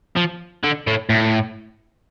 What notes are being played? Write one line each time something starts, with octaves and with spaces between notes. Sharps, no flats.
F3
D3
A2
A2